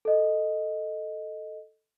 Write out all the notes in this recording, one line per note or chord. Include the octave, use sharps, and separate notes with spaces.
A4 D#5